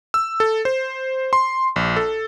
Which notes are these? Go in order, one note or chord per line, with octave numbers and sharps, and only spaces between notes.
E6
A4
C5
C6
A#1
A4